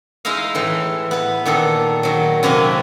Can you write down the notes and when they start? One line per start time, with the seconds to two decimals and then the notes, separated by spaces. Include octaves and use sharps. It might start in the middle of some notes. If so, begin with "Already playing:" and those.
0.25 G#3 D#4 E4 D#5 F5
0.55 A2 E3
1.11 B3 B4
1.45 A#2 D#3 G#4 A4
2.03 D#3 F#3
2.43 F#2 C3 A#3 B4 G#5